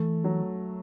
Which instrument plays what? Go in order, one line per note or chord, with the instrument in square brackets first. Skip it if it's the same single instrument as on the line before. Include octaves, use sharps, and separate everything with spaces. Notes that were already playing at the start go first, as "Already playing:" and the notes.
Already playing: [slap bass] E3 [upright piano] A3
[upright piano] F#3